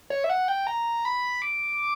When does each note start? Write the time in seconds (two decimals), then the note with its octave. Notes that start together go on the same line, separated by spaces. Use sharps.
0.10 C#5
0.24 E5
0.30 F#5
0.48 G5
0.67 A#5
1.05 B5
1.42 D6